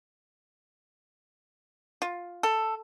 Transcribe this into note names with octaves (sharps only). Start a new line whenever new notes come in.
F4
A4